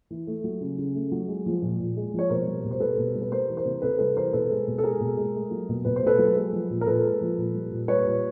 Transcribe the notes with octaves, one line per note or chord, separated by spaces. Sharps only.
E3
A3
F#3
C#3
C#3
A3
F#3
G#3
F3
A#2
A#2
G#3
F3 C#5
B2 A#4 C5
G3
B2
C5
G3 A4 B4
B2
G3
B4
G3 A#4 C5
E3
A#4 C5
C3
C3 A4 B4
G3 A4 B4
E3 A#4 C5
B2 A4 B4
G#3
B2
A4
G#3 G#4 A#4
B2
G#3
A3
F#3
B2
B2 B4
C5
A3 A4 B4
F#3
G#3
F3
A#2
A#4
A#2 A4 B4
G#3
F3
A#2
G3
A#2
G3 B4 C#5
A#2